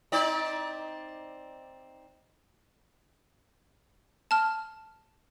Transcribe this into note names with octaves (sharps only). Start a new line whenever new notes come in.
C4 D#4 D5
A5 F6